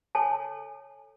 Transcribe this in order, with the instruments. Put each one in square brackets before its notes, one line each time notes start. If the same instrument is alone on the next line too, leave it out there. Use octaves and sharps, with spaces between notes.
[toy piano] A4 C#5 G#5 A5